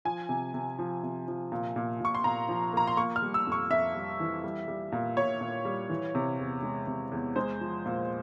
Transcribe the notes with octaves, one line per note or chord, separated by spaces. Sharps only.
F3 G#5
C3
C3
F3
C3
F3
A#2
A#2
A#2 C#6
C6
A#2 A#5
F3
A#3 A#5
C6
A#3 C#6
F6
G3
E6
F2
C#6
F2 E5
G3
E3
G3
G3
A#2
A#2 C#5
A#2
G3
E3
C3
E2
G#3
C3
E2
G#3 C5
F3
A#2